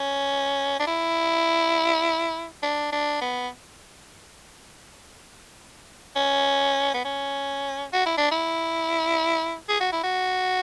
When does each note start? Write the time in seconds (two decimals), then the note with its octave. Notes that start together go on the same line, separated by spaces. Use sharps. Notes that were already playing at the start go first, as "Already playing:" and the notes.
Already playing: C#4
0.80 D4
0.87 E4
2.63 D4
2.92 D4
3.21 B3
6.16 C#4
6.94 B3
7.05 C#4
7.93 F#4
8.06 E4
8.18 D4
8.31 E4
9.69 G#4
9.80 F#4
9.92 E4
10.03 F#4